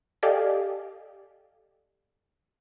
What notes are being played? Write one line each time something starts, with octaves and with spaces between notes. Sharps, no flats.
G4 A4 D5 D#5 F5 G#5